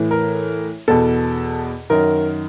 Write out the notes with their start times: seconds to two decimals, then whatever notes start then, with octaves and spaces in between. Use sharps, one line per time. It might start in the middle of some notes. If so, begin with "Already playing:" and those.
Already playing: A2 E3
0.11 A#4
0.88 E2 B2 A4
1.90 F#2 D#3 A#4